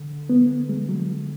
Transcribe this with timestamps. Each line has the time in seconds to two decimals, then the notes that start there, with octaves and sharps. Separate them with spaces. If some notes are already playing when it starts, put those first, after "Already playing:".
Already playing: D3
0.30 B3
0.69 G#3
0.89 F#3